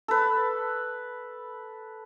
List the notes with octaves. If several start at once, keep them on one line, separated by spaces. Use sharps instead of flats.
A4 B4